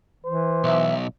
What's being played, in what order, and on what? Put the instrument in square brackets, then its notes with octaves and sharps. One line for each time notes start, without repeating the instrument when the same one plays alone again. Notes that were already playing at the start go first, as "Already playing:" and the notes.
[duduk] E3 [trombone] C5
[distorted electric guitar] B1 [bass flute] E5